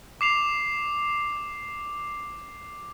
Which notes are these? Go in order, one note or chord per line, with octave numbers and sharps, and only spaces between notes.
D6 C7 F7